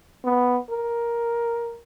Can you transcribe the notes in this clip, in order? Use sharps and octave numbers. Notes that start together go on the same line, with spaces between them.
B3
A#4